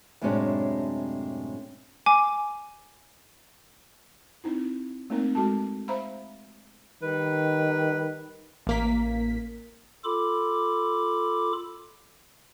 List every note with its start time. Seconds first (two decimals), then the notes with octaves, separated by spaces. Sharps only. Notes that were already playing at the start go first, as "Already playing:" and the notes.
0.22 F#2 A2 C3 G#3 C#4 D4
2.06 G#5 D6
4.44 C4 D#4 E4
5.10 A3 A#3 C4 D#4 A#4
5.35 G#3 F#4 A4 A5
5.88 C5 E5 F5 A#5 B5
7.03 D#3 G3 B4
8.67 A1 A#3 B6
10.04 F4 A4 B5 D6